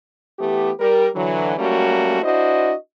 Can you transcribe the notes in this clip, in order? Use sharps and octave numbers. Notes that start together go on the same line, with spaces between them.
E3 A3 B3 G4
G3 A#4
D3 E3 F#3
F#3 G3 A3 A#3 C#4 F#4
D4 E4 F#4 C5 D#5